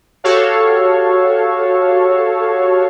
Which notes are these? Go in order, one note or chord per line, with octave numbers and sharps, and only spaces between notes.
F#4 G4 A4 C#5 F5